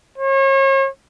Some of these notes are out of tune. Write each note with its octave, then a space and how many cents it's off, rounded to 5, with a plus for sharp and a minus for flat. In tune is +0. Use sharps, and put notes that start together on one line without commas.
C#5 -40